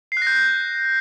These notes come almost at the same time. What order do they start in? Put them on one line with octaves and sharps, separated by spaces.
C7 F#6 A#6 G6